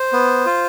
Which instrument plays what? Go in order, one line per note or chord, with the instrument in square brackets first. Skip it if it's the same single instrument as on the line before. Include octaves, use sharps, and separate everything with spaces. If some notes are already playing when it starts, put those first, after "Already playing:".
Already playing: [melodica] C5
B3
F4